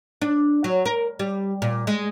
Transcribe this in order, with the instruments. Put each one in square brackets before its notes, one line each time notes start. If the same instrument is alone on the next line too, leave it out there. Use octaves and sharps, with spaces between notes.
[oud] D4
F#3
A#4
G3
A#2
G#3